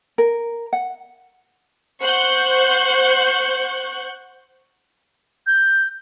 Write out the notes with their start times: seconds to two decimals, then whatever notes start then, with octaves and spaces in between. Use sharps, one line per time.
0.18 A#4
0.73 F#5
2.00 C5 F#5 C#6 F#6 G6
5.47 G6